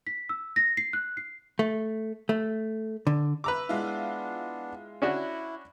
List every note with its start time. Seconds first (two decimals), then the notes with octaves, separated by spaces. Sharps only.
0.07 B6
0.29 E6
0.56 A#6
0.77 C7
0.93 F#6
1.17 C7
1.59 A3
2.29 A3
3.07 D3
3.44 B4 A#5 D6 E6
3.69 G#3 B3 D4 E4 F4
5.02 C#4 D4 E4 F#4